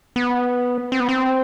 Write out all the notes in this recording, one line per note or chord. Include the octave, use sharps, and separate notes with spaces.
B3
C4
B3
C4